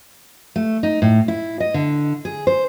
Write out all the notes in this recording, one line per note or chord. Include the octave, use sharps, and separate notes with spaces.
A3
D#4
A2
E4
D#5
D3
G#4
C5